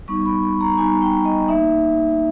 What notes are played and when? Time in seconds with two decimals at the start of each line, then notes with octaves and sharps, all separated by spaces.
0.08 G3 B3 D#4 C#6
0.26 B5
0.43 B5
0.60 A#5
0.78 G3 B3 D#4 G#5
1.02 G5
1.25 D#5
1.48 A#3 D#4 E5